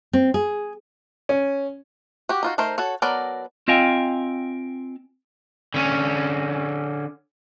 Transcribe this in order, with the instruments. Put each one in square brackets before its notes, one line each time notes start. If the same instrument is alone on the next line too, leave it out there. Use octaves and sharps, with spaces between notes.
[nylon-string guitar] C4
G#4
[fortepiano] C#4
[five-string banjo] F#4 G4
D#4 F4 F#4
A3 D#4 A#4 C5
F#4 A4 C#5
F#3 B3 A4 A#4 D5
[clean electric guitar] C4 F4 D#5 F5 G5 G#5
[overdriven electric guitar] D3 C#4